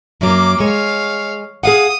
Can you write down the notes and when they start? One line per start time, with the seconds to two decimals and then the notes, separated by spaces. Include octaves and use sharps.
0.21 F#2 F#3 A#3 D6
0.60 G#3 C#5 F5
1.63 G#4 F5 F#5 D#6